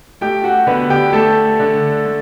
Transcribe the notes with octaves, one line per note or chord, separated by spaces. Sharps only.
A3 G4 G5
F#4 F#5
D3 B3 B4
G4 G5
A3 A4 A5
D3
A3